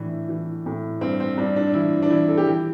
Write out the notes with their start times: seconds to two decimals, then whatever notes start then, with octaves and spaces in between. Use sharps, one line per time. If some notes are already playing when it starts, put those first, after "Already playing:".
Already playing: A2 E3 D4
0.29 E3
0.66 A2
1.01 G2 C4
1.20 C4
1.38 G2 D4
1.56 D4
1.74 E3 E4
2.02 D4
2.10 E3 E4
2.28 A4
2.37 G4
2.46 E3 E4